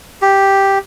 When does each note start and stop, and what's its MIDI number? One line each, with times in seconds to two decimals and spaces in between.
0.22 0.79 67